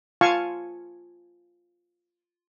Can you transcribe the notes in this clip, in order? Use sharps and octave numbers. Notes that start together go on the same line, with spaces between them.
F4 F5 G#5 A5 C#6